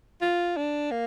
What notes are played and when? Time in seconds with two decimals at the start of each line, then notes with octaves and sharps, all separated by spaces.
0.21 F4
0.57 D4
0.91 A#3